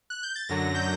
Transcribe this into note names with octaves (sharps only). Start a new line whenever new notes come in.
F#6
G6
A6
F#2 D3 F#3 A#6
G6